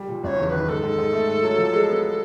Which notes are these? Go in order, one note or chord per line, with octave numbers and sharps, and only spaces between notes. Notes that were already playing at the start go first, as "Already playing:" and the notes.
Already playing: G3
A#2
F#1 C#5 D5
E2
C#5
D#3 B4
G#2 A4
G#2
G#2
A3
G#2
F#3
F3
G#3
B3